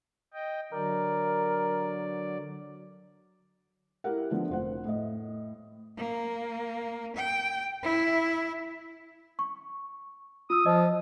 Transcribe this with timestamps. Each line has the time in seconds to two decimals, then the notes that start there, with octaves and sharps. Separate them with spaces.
0.33 D#5 G5
0.72 D3 F#3 A#4 D5
4.04 E4 G4 A#4 F#5
4.31 D3 F3 B3
4.49 F1 C5 F#5
4.85 A2 D#5
5.97 A#3
7.16 G5
7.83 E4
9.39 C#6
10.50 F4 D#6 E6
10.66 F3 D#5